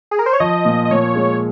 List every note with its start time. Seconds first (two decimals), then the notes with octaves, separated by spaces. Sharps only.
0.11 G#4
0.19 A#4
0.26 C5
0.33 C#5
0.40 F3 D#5
0.65 A#2
0.85 D#5
0.91 A#2 C#5
1.16 G#3